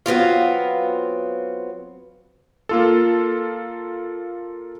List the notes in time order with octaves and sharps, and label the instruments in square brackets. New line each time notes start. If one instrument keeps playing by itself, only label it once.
[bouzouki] F#3 B3 C4 F4
[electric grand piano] A#3 F4 A4